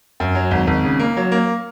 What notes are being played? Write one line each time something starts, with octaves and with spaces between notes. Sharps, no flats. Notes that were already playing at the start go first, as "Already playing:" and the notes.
F#2
F#3
G#1
G#1
C#3
A#3
F#3
A#3